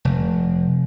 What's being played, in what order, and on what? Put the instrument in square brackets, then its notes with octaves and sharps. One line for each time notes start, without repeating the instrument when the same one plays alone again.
[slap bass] F1